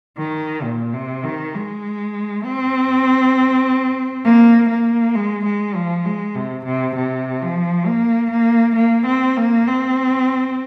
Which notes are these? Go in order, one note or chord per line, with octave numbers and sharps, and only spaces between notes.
D#3
A#2
C3
D#3
G#3
C4
A#3
A#3
G#3
G#3
F3
G#3
C3
C3
C3
F3
A#3
A#3
A#3
C4
A#3
C4